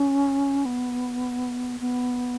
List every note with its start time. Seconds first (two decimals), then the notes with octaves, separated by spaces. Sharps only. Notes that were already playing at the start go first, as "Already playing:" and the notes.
Already playing: C#4
0.66 B3
1.80 B3